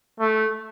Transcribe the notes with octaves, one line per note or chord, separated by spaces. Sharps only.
A3